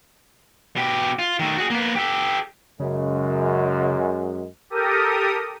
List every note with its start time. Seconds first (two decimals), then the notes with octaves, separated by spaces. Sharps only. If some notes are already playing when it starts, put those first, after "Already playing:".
0.76 B2 G4
1.19 F4
1.39 D#3 A3
1.57 F#4 G#4
1.70 A#3 B3
1.96 G4 A4
2.80 F#2 C#3 G#3
4.70 G4 A4 A#4 D#6